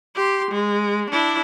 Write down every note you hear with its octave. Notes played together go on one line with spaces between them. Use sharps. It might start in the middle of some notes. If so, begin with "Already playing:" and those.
G4 C6
G#3
D4 E4